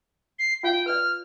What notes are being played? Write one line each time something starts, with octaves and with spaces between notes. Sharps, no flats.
C7
F4 D5 F5 G5
B4 D5 F6